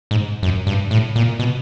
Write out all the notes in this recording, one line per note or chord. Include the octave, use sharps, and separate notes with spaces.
G#2
F#2
G2
A2
A#2
B2